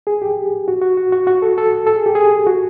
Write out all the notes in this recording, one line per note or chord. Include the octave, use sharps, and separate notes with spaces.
G#4
G4
F#4
F#4
F#4
F#4
F#4
A4
A4
A4
G#4
G4
G#4
F#4